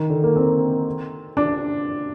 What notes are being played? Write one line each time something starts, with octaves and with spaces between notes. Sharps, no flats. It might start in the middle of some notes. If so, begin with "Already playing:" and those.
Already playing: D#3
D3
A#3
C4
D4